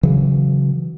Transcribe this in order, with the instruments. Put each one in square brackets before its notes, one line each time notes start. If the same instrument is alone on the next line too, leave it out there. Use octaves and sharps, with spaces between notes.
[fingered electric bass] C#3 E3 F#3